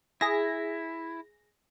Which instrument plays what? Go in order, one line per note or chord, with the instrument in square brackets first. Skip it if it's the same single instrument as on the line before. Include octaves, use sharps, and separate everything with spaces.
[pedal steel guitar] E4 [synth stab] G#4 A#6